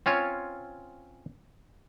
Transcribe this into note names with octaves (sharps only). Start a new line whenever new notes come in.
C4 C#4 F4 C#5